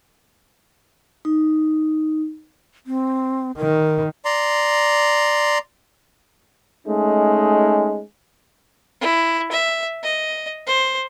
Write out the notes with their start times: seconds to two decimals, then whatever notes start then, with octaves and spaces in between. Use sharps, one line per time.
1.25 D#4
2.86 C4
3.58 D#3 A#4
4.25 D5 A#5 C6
6.87 G#3 A3 C#4 D#4
9.01 E4
9.52 E5
10.03 D#5
10.67 C5